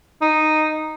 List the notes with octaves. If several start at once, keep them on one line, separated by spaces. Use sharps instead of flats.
D#4